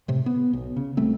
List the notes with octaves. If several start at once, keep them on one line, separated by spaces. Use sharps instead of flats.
A2 C3
B3
B1
C#3
A#1 G3 A3 C4